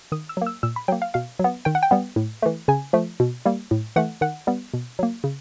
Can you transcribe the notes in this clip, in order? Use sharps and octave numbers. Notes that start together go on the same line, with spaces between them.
D#3 D#6
E6
F#3 A#3
E6
A#2 E6
B5
F#3 A#3 G5
F5
B2 F5
F#3 B3
D#3 G5
F#5
G5
G3 B3
A2
E3 A3
C#3 G#5
F3 A3
B2
G3 A#3
A2
E3 A3 F#5
D#3 F#5
G3 B3
B2
F#3 A#3
C#3